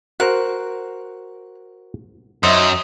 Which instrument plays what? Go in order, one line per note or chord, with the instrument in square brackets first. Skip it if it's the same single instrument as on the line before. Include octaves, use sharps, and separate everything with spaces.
[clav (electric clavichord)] F#4 A#4 C5 [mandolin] F#6
[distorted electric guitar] F#2 [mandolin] D#4 C5 E5 [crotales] D#6